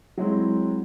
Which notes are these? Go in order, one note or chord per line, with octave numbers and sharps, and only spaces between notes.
F#3 G#3 C4 E4